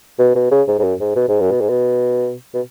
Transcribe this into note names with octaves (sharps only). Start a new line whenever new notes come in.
B2
B2
C#3
G#2
G#2
F#2
G#2
B2
G#2
F#2
B2
G#2
B2
B2